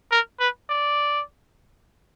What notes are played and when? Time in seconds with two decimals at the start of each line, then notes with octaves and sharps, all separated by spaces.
0.12 A#4
0.40 B4
0.69 D5